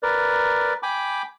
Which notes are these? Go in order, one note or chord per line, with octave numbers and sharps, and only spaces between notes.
A#4 B4 D5
G5 G#5 B5 D6